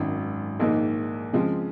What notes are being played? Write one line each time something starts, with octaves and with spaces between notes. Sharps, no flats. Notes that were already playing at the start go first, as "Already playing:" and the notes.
Already playing: G#1 F#2 D#3
A#1 G#2 D#3 A#3 D#4
C#3 F3 G#3 C4